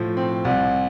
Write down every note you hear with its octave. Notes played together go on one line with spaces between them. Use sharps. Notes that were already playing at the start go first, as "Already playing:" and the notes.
Already playing: A2 F3
C4
C2